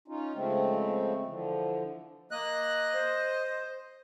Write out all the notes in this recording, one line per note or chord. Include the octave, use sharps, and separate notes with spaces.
C#4 D#4 F4
C#3 F3 G#3 A3 C4
D3 E3 F3
A#3 D#5 F#6
C5